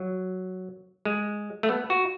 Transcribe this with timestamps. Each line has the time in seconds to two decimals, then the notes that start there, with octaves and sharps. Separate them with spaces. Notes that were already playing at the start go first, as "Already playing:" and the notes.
Already playing: F#3
1.05 G#3
1.63 A3
1.69 B3
1.90 F#4